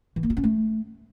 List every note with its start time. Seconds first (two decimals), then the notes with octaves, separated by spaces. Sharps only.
0.16 E3
0.23 A#3
0.30 F4
0.37 C#4
0.44 A3